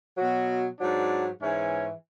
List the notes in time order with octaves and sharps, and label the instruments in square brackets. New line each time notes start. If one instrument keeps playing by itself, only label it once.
[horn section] B2 F#3 F#4
G#2 F#3 D4
G#2 E3 C#4